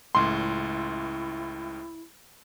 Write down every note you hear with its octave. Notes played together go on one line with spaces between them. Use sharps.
C#2 A2 E4 C6